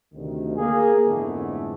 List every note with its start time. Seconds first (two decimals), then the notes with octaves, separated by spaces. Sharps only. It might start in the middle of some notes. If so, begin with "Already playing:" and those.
0.14 D2 C3 D#3
0.56 A#3 G#4
1.06 F2 G#2 D3 E3 A3 B3